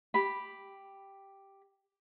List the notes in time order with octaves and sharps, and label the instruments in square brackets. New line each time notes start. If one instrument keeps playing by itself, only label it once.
[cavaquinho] G4 B5